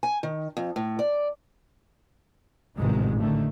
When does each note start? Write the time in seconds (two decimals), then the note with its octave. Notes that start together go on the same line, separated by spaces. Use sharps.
0.03 G#5
0.23 D#3
0.57 F2
0.76 A2
0.99 D5
2.78 A1 F2 G#2 C3 D#3 G#3
3.19 D3 D#3 A3